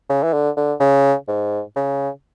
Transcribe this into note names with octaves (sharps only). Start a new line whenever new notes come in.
C#3
E3
D3
D3
C#3
G#2
C#3